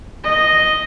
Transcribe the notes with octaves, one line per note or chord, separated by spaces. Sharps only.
D#5